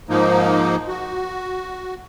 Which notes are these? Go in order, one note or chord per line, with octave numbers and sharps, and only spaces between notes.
G#2 F3 A#3 D#4
F#4